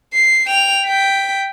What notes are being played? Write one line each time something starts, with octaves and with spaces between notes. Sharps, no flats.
C7
G5 F7
G5 B6